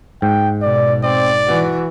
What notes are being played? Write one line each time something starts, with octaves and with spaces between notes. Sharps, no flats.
G#2 G5
B2 D5
C4 D5
E3 F#4